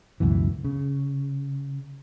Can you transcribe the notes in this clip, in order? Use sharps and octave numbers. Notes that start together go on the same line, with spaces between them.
C#2 F#2 B2 E3
C#3